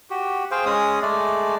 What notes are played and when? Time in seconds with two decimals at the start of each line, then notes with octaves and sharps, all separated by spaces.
0.10 F#4 G4
0.51 G#4 C5 F5 G5
0.65 G#3 C#4 D#6
1.02 G#3 A3 D5